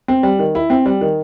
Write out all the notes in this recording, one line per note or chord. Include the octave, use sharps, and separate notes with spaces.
C4
G3
D#3
E4
C4
G3
D#3